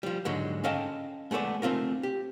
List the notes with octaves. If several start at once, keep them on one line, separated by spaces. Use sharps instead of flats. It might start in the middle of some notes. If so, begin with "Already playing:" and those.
F3 G3
G#2 D3 F#3 G#3
C#4 A4 D#5 F5 G5 A5
G#3 A3 B3 A4 D5
A3 C4 F4 A#4
G4